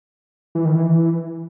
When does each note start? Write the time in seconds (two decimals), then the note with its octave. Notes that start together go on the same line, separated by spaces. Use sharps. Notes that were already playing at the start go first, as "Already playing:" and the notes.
0.55 E3
0.65 D#3
0.75 E3